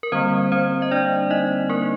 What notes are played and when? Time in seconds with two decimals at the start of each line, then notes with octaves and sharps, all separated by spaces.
0.03 A#4
0.12 D3 G3 A#3 C4 C5
0.52 C4 C5
0.82 D#5
0.91 D4 D5
1.30 D#4 D#5
1.69 A#3 A#4